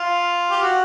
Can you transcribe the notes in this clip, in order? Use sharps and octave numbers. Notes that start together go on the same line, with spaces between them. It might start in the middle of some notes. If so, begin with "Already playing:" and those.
Already playing: F4
G4
F#4